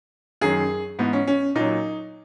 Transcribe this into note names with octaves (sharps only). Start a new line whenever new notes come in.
F#2 D#3 F#3 G#4
G#2 E3 B3
C#4
C#4
A#2 F#3 D#4